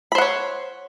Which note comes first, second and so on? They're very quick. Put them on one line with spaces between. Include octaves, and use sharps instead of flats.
B5 C5 F#5 C#5